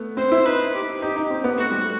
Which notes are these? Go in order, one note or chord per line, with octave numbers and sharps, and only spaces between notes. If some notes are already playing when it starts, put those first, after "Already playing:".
Already playing: A3 B3
C4 C5
E4
D#4 B4
G4
D#4 G4
D#4
C4
B3
A3 F#4
G3
A3